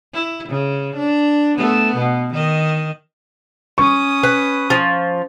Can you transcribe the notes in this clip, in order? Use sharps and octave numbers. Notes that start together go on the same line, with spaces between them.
E4
C#3
D4
A3 B3
B2
D#3 D#5
C#4 C#6 D#6
B4
F3